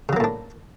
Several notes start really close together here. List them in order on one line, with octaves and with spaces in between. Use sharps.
C#3 F#3 A#3 A2 D4